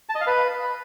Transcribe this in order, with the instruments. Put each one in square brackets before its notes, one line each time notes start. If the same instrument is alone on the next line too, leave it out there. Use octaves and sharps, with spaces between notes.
[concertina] A5
D#5
F5
B4